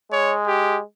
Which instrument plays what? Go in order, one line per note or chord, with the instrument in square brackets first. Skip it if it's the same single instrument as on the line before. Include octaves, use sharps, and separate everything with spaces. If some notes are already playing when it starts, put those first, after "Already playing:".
[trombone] G#3 [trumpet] C#5
[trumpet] G4